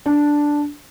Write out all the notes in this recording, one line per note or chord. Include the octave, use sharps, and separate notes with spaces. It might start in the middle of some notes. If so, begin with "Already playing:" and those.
D4